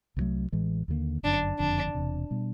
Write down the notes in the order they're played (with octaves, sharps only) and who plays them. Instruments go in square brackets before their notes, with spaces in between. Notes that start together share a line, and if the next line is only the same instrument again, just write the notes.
[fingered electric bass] C2 B2 F#3 A3
A1 A2 E3 G#3
D#2 D3 G3 A#3
[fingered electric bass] G1 F#2 D3 [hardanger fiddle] D4
[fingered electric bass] F#1 F2 D3 [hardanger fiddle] D4
[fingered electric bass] E1 E2 C3
B2 G3 B3